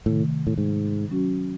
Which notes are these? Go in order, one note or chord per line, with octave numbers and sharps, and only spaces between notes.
A2 C3 D#3 A3
A2
G#2
F#3 C#4 F#4